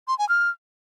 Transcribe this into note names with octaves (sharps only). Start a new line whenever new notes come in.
C6
G#5
F6